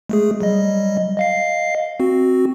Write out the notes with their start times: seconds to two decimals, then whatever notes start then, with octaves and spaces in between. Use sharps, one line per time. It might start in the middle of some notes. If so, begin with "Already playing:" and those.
0.10 G#3 A3 G#4
0.41 F#3 G3 D#5
1.17 D#5 F5 C7
2.00 C4 F#4